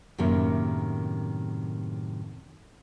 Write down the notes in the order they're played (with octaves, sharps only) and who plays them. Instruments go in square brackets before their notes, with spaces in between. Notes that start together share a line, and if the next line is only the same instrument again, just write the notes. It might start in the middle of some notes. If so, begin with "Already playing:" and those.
[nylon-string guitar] F#2 A2 C3 D#3 A#3